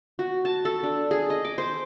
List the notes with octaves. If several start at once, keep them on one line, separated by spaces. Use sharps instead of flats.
F#4
A5
A4
D4
G#4
D#5
D6
C5